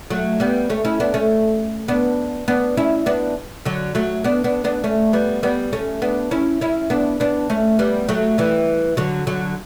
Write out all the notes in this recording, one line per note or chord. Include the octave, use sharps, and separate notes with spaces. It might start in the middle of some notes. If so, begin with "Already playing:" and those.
F#3 A3
G3 B3
A3 C#4
C#4 E4
B3 D4
A3 C#4
B3 D4
B3 D4
C#4 E4
B3 D4
D3 F#3
F#3 A3
B3 D4
B3 D4
B3 D4
A3 C#4
G3 B3
G3 B3
A3 C#4
B3 D4
C#4 E4
C#4 E4
B3 D4
B3 D4
A3 C#4
G3 B3
F#3 A3
E3 G3
D3 F#3
D3 F#3